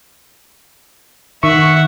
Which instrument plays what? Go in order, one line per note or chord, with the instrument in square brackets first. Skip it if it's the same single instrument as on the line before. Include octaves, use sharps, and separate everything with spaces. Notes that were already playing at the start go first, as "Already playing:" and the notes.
[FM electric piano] D#3 C#6 [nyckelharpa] E5 F#5